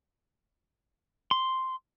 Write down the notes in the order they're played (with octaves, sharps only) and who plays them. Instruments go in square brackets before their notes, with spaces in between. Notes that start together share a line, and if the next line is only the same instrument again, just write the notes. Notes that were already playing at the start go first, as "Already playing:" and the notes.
[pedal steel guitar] C6